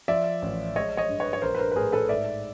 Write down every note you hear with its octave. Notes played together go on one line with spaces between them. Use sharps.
F3 D5 E5
A1
G#3 C#5 D#5
C#5 D#5
G2
B4 C#5
C#5
A#1 A#4 C5
B4
A#4 C5
B4
A2 G#4 A#4
A4 B4
G#2 D5 E5